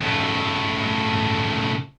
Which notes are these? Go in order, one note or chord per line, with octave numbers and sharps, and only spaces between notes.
C#2 A2